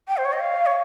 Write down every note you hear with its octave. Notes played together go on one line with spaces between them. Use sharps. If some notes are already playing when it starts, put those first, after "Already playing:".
G5
C5
C#5
D#5
F5
C#5